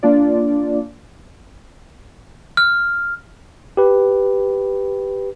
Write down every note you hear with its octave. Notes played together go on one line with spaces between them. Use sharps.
A#3 D4 F4 D5
F6
G4 B4